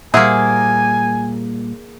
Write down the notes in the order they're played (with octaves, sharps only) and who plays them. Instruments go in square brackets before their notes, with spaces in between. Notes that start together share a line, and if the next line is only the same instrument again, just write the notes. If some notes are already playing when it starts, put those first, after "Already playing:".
[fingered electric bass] A#2 G3 [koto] A#3 G#4 [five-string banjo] C5 E5 F#5 [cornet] G#5